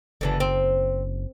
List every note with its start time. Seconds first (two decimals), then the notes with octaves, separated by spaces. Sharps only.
0.21 F#1 D3 E3 D4
0.40 C4